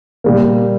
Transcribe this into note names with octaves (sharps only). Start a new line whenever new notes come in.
A#2 G3 A#3